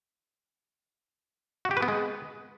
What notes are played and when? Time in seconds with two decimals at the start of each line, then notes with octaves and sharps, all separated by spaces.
1.65 F#4
1.71 G4
1.77 B4
1.83 B3
1.88 G#3